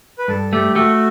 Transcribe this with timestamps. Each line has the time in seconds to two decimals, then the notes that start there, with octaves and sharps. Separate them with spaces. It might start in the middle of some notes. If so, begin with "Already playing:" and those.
0.18 B4
0.28 G2 A4
0.53 A3 G4
0.75 A3 F#4